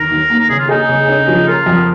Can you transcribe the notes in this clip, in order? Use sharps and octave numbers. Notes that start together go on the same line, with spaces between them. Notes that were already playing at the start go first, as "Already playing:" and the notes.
Already playing: D#2 A#4
D#2
A#3
A#4
C#3 G#4
F4
D#4 G#4
C#3
C#4
F3
F4 A#4
F2